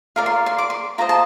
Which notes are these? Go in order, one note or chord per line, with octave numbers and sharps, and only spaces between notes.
F4 A#4 D5 F5
C6
C6
D6
C6
F4 C5 D#5 A#5
A5